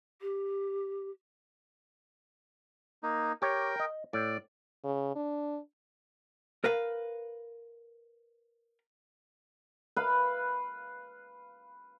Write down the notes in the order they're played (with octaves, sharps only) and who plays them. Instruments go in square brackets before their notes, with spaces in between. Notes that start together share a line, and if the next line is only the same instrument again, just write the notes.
[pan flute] G4
[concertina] A#3 D#4
[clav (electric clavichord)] G4 C#5 [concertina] A#4 G5
[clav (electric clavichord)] D#5
[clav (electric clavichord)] A2 [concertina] D5
[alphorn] C#3
D4
[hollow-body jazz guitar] A#4 B4 F5
[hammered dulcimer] B4 F5